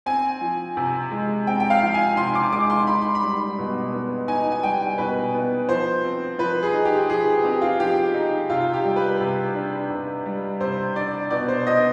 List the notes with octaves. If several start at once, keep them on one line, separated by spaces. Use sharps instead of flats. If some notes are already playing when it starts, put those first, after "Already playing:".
C4 G#5
F3
C3
G#3
C4 G5
G5
F5
F3
G#5
C3 C6
D6
G#3 D6
C6
D#4 B5
C6
B5
G3
B2
B3
D#4 G#5
G#5
G3 G5
B2 B4
B3
F3 C5
C4
F3 B4
G#4
D#4
G4
F3 G#4
C4 G4
F4
F3 G4
D#4
C3 F4
G4
G3
B4
C3
D4
C3
G3
C3 C5
D4 D5
B2 D5
C5
B3 D#5